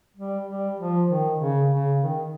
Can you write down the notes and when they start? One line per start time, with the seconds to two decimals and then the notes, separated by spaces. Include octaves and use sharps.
0.17 G3
0.47 G3
0.79 F3
1.09 D#3
1.39 C#3
1.71 C#3
2.01 D#3